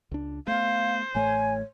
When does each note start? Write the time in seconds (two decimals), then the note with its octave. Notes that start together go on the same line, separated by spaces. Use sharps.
0.11 C#2 D4
0.48 A3 B3 C5 F5
1.15 A1 A2 A3 C#5 G#5